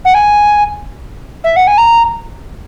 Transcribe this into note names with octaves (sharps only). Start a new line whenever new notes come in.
F#5
G#5
E5
F#5
G#5
A#5